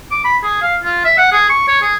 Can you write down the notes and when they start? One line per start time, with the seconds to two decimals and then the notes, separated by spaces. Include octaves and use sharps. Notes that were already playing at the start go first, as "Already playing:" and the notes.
0.11 D6
0.24 B5
0.43 G#4
0.62 F5
0.84 F4
1.05 E5
1.18 F#5
1.32 G#4
1.49 C#6
1.68 C#5
1.82 G#4